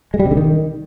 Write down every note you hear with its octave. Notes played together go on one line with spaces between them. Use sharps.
G#3
G3
C3
D3
D#3